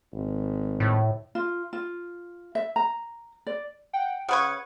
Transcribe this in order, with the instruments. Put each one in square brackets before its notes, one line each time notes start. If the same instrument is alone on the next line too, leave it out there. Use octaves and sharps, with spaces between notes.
[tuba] G#1
[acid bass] A2
[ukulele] F4
F4
E5
A#5
D5
[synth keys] F#5 G5
[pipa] C#3 B4 C#6 [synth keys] F#5 G#6